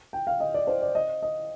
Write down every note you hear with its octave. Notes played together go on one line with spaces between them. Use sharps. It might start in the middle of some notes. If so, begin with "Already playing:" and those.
G5
F5
D#5
D5
C5
D5
D#5
D#5